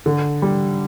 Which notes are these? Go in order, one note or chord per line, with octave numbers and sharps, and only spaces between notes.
D3
G3